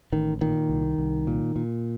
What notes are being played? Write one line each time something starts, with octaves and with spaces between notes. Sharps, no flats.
A1 D#3
A#2 D#3
C2
C2
A#2
A#2